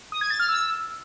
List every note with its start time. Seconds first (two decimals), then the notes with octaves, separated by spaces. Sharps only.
0.12 D#6
0.21 G#6
0.30 A6
0.39 F6
0.49 E6